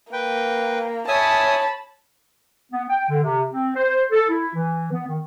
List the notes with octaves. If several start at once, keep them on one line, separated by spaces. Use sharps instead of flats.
A#3 B4 G5
C#5 E5 G#5 A5 B5 D#6
B3
G5
D3
C3
C4
C5
A4
E4
E3
B3
D#3